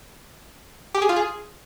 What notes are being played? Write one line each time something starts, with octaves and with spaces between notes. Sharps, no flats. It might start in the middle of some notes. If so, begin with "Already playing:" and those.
G4
G#4
F4
G#4